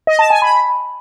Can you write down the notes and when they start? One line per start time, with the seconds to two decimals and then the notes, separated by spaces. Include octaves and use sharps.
0.07 D#5
0.19 A5
0.30 G#5
0.42 B5